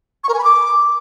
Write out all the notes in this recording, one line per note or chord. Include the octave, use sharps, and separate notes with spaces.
C#6
A#4
G#5
B5
D6